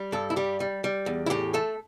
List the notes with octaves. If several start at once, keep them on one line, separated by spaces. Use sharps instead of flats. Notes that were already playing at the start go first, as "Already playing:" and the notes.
Already playing: G3
G2 A4
E4
G3 G4
G3
G3
E2
E4
A2 G4
A3 A4